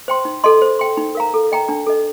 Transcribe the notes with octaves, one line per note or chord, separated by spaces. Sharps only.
C5 G5 C6
D#4
A4 D#5 A5 C6
C5
G5 C6
D#4
A#4 F5 A#5
A4
D#5 G5 A#5
D4
A4 D#5